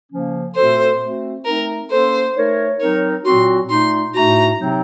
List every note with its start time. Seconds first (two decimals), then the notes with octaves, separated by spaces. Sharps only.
0.11 C#3 F3 A#3 C#4
0.56 A#2 A3 C4 F#4 A4 C5
1.00 A3 C4 F#4
1.45 A3 C4 D#4 A#4
1.90 A#3 C#4 A4 C5
2.36 A3 D#4 A#4 C#5
2.80 F#3 C4 D#4 A#4 C#5
3.25 A#2 F#3 C4 F#4 C6
3.70 A#2 A3 D#4 C6
4.15 A2 A3 D#4 F#4 A#5
4.59 C3 F#3 C4 D#4